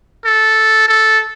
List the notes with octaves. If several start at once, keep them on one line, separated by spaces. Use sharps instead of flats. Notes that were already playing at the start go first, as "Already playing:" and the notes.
A4
A4